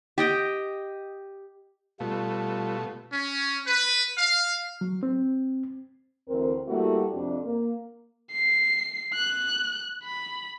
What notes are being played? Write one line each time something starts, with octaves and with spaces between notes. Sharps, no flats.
G4 D#5 G5
B2 G3 A3 F4
C#4
B4
F5
F#3
C4
D2 E3 C4 A#4
G3 A3 A#3 E4 F#4 G4
F2 C3 D4
A#3
C7
F#6
B5